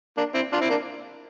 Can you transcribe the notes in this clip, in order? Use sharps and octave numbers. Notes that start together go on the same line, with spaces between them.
A#3 D4
C4 E4
D4 F4
C4 E4
A#3 D4